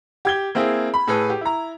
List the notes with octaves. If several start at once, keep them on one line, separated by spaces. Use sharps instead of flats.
G4 G#6 G7
A#3 C4 E4 G#4
B5
A2 G#4 A4 B4
G4
E4 A#5